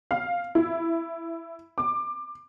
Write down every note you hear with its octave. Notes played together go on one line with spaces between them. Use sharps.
F5
E4
D6